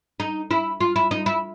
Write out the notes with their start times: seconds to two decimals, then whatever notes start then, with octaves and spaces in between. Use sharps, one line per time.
0.20 D#4
0.51 E4
0.80 F4
0.96 E4
1.11 D#4
1.26 E4